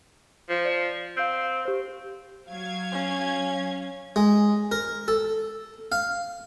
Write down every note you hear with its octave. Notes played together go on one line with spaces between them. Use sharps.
F3
D5
C4 F5 G6
G4 C5
F#3 F5 G#6
C#4
G#3
A#4
A4
F5